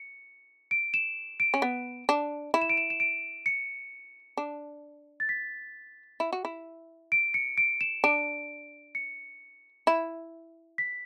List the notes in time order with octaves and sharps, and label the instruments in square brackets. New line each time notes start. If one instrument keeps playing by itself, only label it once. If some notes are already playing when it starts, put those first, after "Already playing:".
Already playing: [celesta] C#7
D7
E7
D7
[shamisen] C#4
B3
D4
E4
[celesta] E7
D7
E7
E7
D7
C#7
[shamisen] D4
[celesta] A6
B6
[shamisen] E4
F#4
E4
[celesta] D7
C#7
D7
E7
[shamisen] D4 [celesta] D7
[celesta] C#7
[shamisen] E4
[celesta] B6